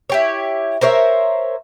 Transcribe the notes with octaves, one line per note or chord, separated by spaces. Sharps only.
E4 G4 C#5
A#4 C5 C#5 E5